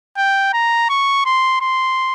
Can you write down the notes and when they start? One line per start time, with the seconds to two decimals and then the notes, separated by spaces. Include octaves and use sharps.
0.17 G5
0.53 A#5
0.89 C#6
1.25 C6
1.61 C6